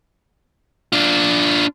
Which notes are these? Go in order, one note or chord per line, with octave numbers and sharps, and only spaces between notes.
D4 F4